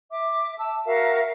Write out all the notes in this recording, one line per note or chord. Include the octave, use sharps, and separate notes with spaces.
E5 D6
A5 E6
F#4 A#4 E5 F5